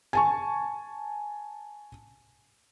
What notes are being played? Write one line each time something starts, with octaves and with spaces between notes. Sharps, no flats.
G#5 A5 C#6